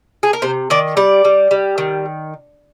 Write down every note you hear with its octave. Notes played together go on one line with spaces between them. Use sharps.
G#4
A#4
C3 C5
D#3 D5
G3 D5
G3
G3
D#3